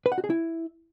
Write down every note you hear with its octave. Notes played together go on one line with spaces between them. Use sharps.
B4
F#5
F#4
G#4
E4